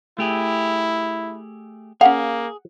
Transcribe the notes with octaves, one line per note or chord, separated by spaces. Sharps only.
A3 E4 G4 G#4
A#3 C#4 G#4 F5 F#5